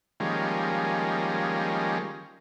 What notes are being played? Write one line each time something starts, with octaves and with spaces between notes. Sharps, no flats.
D#3 F3 G3 G#3 A#3 C#4